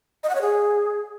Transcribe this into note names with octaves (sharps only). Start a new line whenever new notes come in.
D#5
F#5
C#5
G#4